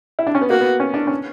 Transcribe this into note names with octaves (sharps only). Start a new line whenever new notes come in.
E4
D4
C#4
B3
A#3 F#4
B3
C#4
D4
C#4